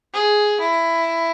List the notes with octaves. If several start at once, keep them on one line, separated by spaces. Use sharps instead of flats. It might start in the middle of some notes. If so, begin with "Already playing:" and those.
G#4
E4